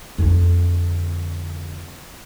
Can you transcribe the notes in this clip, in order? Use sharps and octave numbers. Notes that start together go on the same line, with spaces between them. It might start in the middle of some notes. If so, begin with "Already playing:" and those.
F2 D3